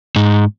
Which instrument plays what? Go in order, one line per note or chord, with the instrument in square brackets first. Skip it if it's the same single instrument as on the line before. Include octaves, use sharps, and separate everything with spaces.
[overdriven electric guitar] G#2